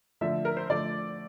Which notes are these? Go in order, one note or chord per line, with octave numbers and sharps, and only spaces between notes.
D3 F3 A3 E5
A#4
C5
D3 F3 A3 D5